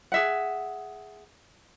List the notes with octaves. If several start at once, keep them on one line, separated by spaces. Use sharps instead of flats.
G#4 E5 F#5